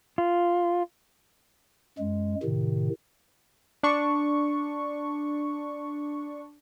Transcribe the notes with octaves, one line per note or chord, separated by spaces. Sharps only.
F4
F#2 G#3
A2 C3 D#3
D4 C#6